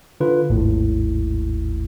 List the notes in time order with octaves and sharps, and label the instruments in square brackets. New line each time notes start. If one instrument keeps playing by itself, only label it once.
[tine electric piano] D3 F4 B4
G#1 D#2 A2